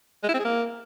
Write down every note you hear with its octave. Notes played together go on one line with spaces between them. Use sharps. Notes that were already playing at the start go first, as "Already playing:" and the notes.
G#3
E4
C4
G#4
A#3